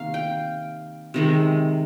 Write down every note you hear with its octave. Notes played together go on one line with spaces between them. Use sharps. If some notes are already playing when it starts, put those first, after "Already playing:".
Already playing: C3 D#3 A#3 F5
G5
C3 D#3 G#3